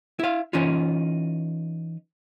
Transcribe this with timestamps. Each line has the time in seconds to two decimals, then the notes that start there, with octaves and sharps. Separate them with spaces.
0.19 E4 F5
0.53 E3 C#4 D#4 F4